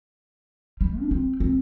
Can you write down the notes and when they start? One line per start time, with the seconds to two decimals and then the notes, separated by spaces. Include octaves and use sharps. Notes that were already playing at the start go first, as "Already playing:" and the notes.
0.81 G3
1.01 D4
1.11 C4
1.40 C4